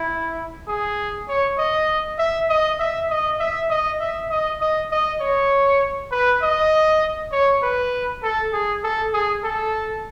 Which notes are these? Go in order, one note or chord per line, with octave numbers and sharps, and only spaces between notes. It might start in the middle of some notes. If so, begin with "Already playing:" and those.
Already playing: E4
G#4
C#5
D#5
E5
D#5
E5
D#5
E5
D#5
E5
D#5
D#5
D#5
C#5
B4
D#5
C#5
B4
A4
G#4
A4
G#4
A4